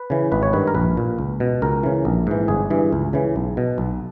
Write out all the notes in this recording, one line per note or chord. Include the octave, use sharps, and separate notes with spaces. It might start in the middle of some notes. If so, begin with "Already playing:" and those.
Already playing: B4
C#3 E3
G#1 B4
C#5
G2 D#3 B4
A#4
A#1 B4
A#2
C#2
B2
C#2 A#4
C#3 E3
A#1
G#2 E3
G1 G#4
G2 E3
C#2
C#3 E3
B1
B2
B1